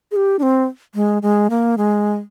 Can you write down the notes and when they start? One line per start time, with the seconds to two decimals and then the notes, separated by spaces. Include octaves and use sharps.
0.11 G#4
0.16 G4
0.39 D4
0.43 C4
0.95 G#3
1.22 G#3
1.50 A#3
1.78 G#3